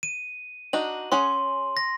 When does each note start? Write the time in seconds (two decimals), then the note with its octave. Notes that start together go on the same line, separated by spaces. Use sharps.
0.03 D#7
0.73 D4 D#4 F#4 F#7
1.12 C#4 G#4 F#5 C6
1.77 A#6